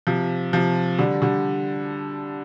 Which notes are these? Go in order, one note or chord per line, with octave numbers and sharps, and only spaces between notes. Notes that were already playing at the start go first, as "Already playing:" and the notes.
C3 F3
C3 F3
D3 G3
D3 G3